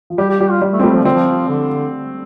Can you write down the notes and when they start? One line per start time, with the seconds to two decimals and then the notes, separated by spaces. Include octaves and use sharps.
0.10 F3
0.18 G3 G4
0.30 G4
0.40 G3 G4
0.51 F4
0.62 G3
0.73 A3
0.80 C4
0.83 G3 A3
0.94 F3
1.04 D3 C4
1.13 F3
1.49 D3